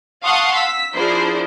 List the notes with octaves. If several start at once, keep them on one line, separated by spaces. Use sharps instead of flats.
F5 F#5 A5 C6 C#6 D#6
E6 B6
F3 D4 E4 G#4 A#4 C5